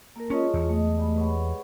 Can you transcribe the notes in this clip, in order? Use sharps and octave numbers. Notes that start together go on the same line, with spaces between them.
A#3 A4 A#4
G#3 C#4 F4 C#5 A5 C#6
E2
A3 D#5 G#5
G3 G#3
B4 C#5 F#5